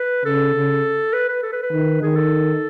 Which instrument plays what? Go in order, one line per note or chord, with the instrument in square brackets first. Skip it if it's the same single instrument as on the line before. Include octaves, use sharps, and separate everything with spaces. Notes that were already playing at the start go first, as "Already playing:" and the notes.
Already playing: [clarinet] B4
[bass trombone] C#3 [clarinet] A4
[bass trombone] C#3
[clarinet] B4
B4
A4
B4
B4
[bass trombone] D#3
[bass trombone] D#3 [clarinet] G#4
[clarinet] A4